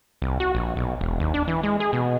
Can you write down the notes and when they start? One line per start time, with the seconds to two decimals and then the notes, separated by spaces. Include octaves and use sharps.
0.22 C2
0.40 F#4
0.55 A#1
0.77 B1
1.01 E1
1.20 D#2
1.34 D4
1.48 E3
1.63 G#3
1.80 G#4
1.93 B2